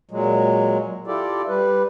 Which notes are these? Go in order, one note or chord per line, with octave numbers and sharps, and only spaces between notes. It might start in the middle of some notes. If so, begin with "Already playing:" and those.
A#2 F#3 G#3
E4 F4 G4 A4 D5
G3 B4